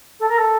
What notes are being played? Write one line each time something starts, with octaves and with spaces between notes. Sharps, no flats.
A4
A#4
A4